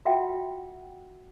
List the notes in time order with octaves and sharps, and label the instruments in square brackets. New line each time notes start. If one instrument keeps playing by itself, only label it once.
[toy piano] F4 F#4 E5 F#5 G5